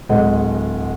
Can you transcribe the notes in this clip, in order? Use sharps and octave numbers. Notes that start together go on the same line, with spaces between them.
D1 G#3 D#5 F#5